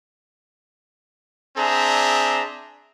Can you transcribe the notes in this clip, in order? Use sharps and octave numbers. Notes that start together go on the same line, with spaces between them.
C4 D4 G#4 E5 A#5